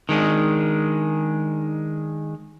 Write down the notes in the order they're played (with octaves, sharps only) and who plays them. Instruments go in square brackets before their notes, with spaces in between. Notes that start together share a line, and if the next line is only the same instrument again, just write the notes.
[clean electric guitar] D#3 G#3 D4